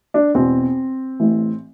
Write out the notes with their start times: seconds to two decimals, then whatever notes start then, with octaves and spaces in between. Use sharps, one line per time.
0.14 D4
0.34 E2 B2 C4
1.20 A1 A2 E3